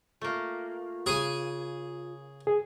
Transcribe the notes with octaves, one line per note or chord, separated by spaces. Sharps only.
A3 A#3 F4
C#3 G#4 G#5
G#4